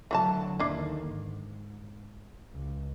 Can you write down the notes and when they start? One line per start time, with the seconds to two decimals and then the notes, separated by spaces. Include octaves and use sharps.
0.11 A2 D3 E3 F#3 F#4 A5
0.59 D#2 D3 D#3 D4 E4
1.08 G#2
2.52 C#2